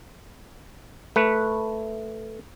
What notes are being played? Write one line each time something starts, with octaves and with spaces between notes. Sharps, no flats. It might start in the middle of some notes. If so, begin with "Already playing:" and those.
A3 B4